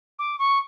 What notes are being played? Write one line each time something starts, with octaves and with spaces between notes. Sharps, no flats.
D6
C#6